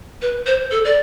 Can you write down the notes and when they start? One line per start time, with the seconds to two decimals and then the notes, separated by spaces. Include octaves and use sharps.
0.22 B4
0.46 C5
0.71 A4
0.85 D5